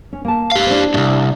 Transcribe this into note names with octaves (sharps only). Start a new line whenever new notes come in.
C#4
A#3 A5
G4 F5
D4 E4 C5
C2 G2